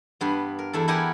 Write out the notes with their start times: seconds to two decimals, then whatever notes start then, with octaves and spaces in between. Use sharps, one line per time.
0.21 G2 B3
0.59 A#4
0.73 E2 E4 A4
0.88 E4 G4 A#4 F#5 G#5